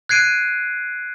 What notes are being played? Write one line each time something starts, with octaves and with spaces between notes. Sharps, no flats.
F#6 G#6 C7 D7 D#7